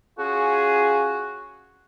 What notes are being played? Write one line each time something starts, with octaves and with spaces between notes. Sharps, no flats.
C#4 F4 F#4 G#4